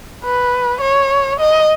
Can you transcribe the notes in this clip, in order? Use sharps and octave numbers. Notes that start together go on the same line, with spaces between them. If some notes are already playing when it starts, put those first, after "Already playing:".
B4
C#5
D#5